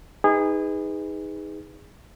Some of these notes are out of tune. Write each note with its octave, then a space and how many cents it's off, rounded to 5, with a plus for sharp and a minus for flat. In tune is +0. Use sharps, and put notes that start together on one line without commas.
D#4 +20 G#4 -25 B4 +10